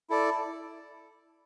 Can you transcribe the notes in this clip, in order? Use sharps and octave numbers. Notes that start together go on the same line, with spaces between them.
E4 A4 D5